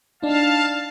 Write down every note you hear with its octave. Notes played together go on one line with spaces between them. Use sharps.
D4 D#4 F5 A5